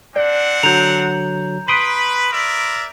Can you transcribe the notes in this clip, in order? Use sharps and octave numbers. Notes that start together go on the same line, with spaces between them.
C4 D4 D5 F#5
D3 F#3 A#5 G6 F7
B4 B5 C6 D#6 B6 D7
A#4 D5 E5